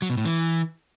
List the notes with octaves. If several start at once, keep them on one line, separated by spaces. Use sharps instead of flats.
F#3
B2
A2
E3